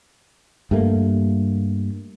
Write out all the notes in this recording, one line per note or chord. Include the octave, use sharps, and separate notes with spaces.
G2 G3 A3 A#3